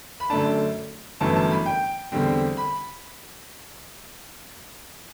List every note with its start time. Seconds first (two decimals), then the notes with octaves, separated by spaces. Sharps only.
0.20 B5
0.30 F#2 D3 A3 D4 A5
1.21 G1 F#2 E3 A3 A5
1.36 A5
1.51 B5
1.66 G5
2.12 E2 D3 G3 C4
2.57 B5